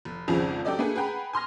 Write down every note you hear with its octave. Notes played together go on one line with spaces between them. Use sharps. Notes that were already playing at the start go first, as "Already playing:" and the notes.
F1
G#1 F2 C#3 F3 G#4 F7
F#3 G4 A4 D5 D#5
A3 A#3 D4 G#4 B4
G#4 B4 F#5 G5 A#5 B5
G#5 C6 F6 A#6